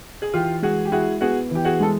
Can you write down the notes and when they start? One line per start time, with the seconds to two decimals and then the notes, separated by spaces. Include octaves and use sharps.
0.22 G#4
0.33 E3 F4 G4
0.62 G#3 F#4 G#4
0.85 G4
0.92 E4 F#4 G#4
1.21 B3 F#4 G#4
1.51 E3 G4
1.65 F#4 G#4
1.80 G#3 A4